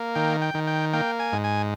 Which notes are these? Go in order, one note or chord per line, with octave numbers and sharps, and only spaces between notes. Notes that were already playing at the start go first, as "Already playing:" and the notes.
Already playing: A#3
D#3 G5
G5
D#3
G5
A#3 G5
G#5
G#2
G#5